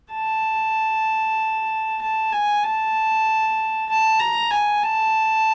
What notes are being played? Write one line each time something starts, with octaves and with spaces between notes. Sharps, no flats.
A5
A5
G#5
A5
A5
A#5
G#5
A5